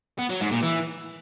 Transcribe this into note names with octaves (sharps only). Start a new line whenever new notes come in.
B3
F#3
G#2
A#2
E3